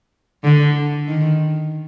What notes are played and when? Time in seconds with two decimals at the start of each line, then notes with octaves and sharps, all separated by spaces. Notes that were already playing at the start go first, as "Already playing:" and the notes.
0.44 D3
1.08 D#3